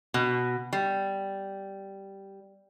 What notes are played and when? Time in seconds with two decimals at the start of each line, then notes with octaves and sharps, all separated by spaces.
0.14 B2
0.73 G3